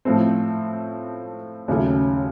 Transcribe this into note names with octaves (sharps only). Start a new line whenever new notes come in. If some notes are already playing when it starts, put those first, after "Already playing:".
A2 F3 A3 C4
D#2 C#3 F#3 A3 C#4